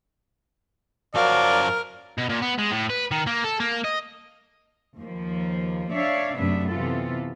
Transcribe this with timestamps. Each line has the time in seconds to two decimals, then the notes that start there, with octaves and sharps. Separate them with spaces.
1.15 F#2 F3 F#3 F#4 A#4 D5 F5
2.18 B2
2.30 A#2
2.42 B3
2.59 G#3
2.71 A2
2.90 B4
3.11 D#3
3.27 A#3
3.44 A4
3.60 A#3
3.84 D#5
4.98 D#2 F3 A#3
5.93 D4 C#5 D5 E5 F5
6.36 F#2 C3 A3 B3 D4 E5
6.72 C3 E3 B3 F4 A4